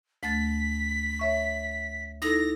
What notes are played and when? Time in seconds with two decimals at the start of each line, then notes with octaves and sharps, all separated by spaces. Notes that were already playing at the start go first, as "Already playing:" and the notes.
0.23 D2 A3 A6 B6
1.19 C#5 E5 C#6
2.22 D#4 E4 A4 A#6